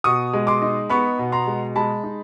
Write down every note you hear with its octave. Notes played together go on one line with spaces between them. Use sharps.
B2 C#6 D#6
G#3
C6 D6
D#4
B3 B5 C#6
B2
A#5 C6
G#3
G#3 A5 B5
D#4